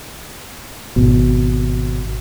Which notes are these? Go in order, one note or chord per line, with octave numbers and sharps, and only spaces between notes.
G#1 B2